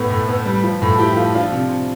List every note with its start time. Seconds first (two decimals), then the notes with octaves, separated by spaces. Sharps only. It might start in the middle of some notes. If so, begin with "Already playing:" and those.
Already playing: A2 B3
0.10 A2 A3
0.28 A2 B3
0.46 G3
0.64 F3
0.82 A2
0.88 A4
0.98 F3 E4 G4
1.17 F3 F4 A4
1.35 F3 D4 F4
1.52 C3
1.70 C3